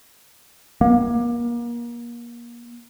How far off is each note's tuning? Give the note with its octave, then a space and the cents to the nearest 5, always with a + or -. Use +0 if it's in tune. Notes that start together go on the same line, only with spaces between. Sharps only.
A#3 +30